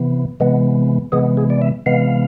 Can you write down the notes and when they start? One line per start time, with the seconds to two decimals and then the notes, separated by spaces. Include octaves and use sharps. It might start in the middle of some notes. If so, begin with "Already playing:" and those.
Already playing: C3 E3 B3
0.40 C3 E3 G#3 B3
1.12 C3 E3 G#3 B3 G#4
1.37 G#4
1.50 D5
1.62 E5
1.86 C3 E3 G#3 B3 F5